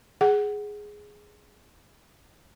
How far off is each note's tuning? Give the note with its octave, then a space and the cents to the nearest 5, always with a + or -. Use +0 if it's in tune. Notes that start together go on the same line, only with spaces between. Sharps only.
G#4 +0 F#5 +15